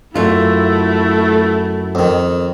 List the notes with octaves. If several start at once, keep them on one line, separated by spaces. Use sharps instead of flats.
F#2 A3 E4 F4
F2 D#3